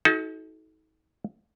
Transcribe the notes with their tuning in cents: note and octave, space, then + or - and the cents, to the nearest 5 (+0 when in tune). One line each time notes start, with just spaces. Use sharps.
D#4 +35 F#4 +0 A4 -30